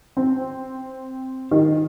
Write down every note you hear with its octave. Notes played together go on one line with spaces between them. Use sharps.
C4
D#3